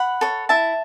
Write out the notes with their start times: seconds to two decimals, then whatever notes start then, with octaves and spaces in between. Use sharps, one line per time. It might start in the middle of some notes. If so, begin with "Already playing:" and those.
Already playing: F#5 B5
0.21 A4 C#5
0.49 E4 E5 A5